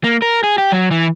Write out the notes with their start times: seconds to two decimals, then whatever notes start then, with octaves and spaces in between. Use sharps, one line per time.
0.04 A#3
0.22 A#4
0.43 G#4
0.58 G4
0.72 F#3
0.91 E3